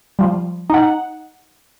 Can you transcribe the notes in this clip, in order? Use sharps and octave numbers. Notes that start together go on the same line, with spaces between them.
F3 G3
D#4 F#5